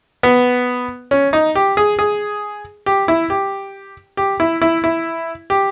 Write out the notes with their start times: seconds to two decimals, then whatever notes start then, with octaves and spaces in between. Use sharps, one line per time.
0.23 B3
1.11 C#4
1.33 D#4
1.55 G4
1.77 G#4
1.99 G#4
2.86 G4
3.08 E4
3.30 G4
4.17 G4
4.40 E4
4.62 E4
4.84 E4
5.50 G4